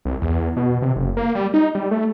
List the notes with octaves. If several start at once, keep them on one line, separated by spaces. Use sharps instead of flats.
C2
E2
B2
C3
F#1
A#3
G3
D#4
G3
A3